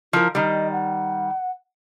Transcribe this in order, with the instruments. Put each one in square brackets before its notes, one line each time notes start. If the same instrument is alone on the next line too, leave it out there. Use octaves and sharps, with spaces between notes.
[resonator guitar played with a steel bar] F3 A#4 [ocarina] E4
[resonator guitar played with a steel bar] D#3 G3 [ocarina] D#5
[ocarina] F#5